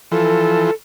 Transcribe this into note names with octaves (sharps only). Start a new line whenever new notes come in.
E3 F3 A4